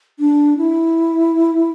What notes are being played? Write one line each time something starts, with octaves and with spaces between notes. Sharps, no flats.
D4
E4